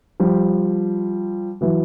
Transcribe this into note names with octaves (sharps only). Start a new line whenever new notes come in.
F3 G3
E3 F#3